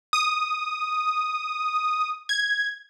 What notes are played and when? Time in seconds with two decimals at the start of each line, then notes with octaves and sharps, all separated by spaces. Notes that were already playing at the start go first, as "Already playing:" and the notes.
0.13 D#6
2.29 G#6